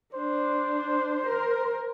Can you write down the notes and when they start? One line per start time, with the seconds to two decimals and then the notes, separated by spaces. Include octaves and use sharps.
0.15 D4 C5
1.26 A#4